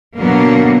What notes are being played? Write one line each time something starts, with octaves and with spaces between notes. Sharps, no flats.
B2 D3 F#3 A#3 B3